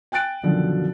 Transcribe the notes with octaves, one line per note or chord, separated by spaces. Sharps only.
G5 G#5 F#6 A6 D7
F#2 B2 D3 D#3 F3 F#3